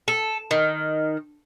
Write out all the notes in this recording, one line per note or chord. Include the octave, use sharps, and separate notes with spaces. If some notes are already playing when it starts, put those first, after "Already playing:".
A4
D#3